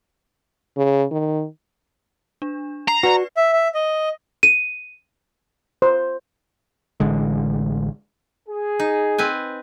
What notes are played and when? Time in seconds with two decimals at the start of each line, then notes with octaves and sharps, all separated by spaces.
0.77 C#3
1.11 D#3
2.42 D4
2.88 A#5 C7
3.03 F#4 B4 D5
3.37 E5
3.53 E5
3.75 D#5
4.43 D#7
5.82 C5
7.00 A1 D3 G#3
8.49 G#4
8.80 D#4
9.18 C4 B4 G#5